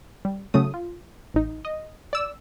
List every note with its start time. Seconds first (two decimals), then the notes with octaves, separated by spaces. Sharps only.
0.25 G3
0.54 C#3 F#3 A3 D#6
0.74 F4
1.34 A1 D#4
1.65 D#5
2.13 D5 E6